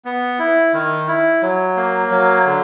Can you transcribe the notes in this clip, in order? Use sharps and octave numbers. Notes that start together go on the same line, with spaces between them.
B3
E4
D#3
E4
F#3
A#3
F#3
D3